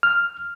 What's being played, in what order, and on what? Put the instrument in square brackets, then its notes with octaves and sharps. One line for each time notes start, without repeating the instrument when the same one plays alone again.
[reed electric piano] F6